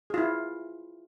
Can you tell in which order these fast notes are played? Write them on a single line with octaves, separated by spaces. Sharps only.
G#4 F4 E4